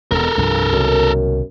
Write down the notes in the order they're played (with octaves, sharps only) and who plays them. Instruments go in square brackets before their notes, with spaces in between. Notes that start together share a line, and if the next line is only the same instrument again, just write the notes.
[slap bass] E1 E2 B2 [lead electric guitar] A4 A#4
[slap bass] C2 G2 F3
[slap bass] C2 B2 D#3 [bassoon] F#2